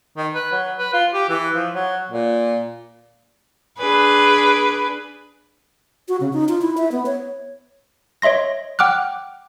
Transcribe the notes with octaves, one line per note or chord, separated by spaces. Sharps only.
D#3
B4
F#3
B4
F4
G4
E3
F3
F#3
A#2
D4 G#4 B4
F#4
C#3
D#4
F4
E4
E5
B3
C#5
C#5 D#5 E5 C6 A#6
F#5 G5 D6 F6 F#6